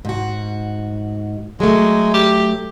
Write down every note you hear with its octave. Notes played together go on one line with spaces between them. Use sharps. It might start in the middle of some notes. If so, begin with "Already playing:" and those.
G#2 F#4
F#3 G#3 A3
G4